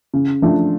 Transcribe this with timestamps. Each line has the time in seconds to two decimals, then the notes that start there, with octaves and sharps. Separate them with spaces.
0.14 C#3
0.42 F3 A3 D4